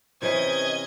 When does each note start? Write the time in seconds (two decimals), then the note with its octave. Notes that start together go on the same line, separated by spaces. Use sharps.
0.22 C3 E3 C#4 D#5 G#6